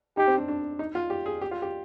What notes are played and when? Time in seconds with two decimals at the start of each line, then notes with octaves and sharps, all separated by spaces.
0.17 D#4 G4
0.27 C4
0.38 D4
0.48 D4
0.79 D#4
0.95 F4
1.10 G4
1.26 G#4
1.41 G4
1.51 F4
1.62 G4